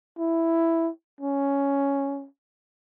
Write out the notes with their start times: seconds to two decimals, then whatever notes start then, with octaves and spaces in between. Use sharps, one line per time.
0.19 E4
1.21 C#4